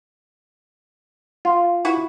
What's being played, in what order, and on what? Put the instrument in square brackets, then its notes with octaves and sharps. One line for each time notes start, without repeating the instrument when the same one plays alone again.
[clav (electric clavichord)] F4
[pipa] E4 F#4